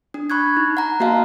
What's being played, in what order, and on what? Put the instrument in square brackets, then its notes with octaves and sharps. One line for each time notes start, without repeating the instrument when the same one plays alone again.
[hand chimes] D4
B5 C#6 F#6 G#6
D#4
F#5 A#5
A#3 F#4 D#5 F5 A5